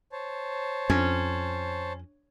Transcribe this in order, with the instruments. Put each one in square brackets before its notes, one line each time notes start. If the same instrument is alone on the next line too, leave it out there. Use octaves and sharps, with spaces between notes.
[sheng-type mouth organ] C5 C#5 A5
[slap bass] F2 [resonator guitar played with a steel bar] C#4